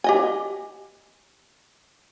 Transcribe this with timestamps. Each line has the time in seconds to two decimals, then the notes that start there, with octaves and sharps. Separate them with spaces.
0.04 G4 D#5 G#5